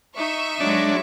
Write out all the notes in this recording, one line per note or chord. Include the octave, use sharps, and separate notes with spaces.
D#4 E5 C#6
F#3 G#3 D4